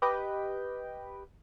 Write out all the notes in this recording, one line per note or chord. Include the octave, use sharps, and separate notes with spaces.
G4 B4 D#5 G5